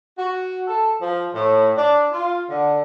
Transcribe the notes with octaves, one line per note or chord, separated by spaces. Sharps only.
F#4
A4
F3
A2
D4
F4
D3